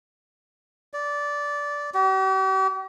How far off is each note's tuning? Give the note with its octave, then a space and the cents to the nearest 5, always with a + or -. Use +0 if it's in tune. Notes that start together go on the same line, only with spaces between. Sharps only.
D5 -15
G4 -45